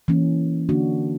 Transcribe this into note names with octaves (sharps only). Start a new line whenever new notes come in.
E3 A#3 C#4
D3 A#3 D4 F#4